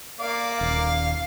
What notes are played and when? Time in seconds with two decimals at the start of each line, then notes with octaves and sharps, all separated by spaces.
0.20 A#3 D5 F5
0.61 D#1 F5